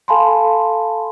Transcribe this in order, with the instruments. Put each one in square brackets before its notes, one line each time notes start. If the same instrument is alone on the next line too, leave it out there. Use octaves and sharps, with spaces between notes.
[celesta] A4 F5 G#5 A5 B5 C6